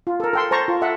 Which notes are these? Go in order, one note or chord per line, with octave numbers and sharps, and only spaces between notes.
F4
A4 A#4
A4 G5 C6
C5 A5 A#5 C#6
F4
A4 E5 F#5